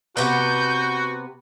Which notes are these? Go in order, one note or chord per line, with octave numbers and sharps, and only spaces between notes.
C3 B3 F#4 G6